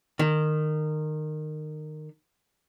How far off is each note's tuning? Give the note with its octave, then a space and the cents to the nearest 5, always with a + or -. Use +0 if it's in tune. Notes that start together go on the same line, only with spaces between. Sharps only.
D#3 -20